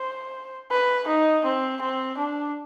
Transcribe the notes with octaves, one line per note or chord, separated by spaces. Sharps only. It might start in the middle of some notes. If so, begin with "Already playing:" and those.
Already playing: C5
B4
D#4
C4
C4
D4